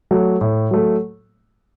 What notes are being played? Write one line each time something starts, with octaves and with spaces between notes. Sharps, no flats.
F#3 A3
A2
F#3 A3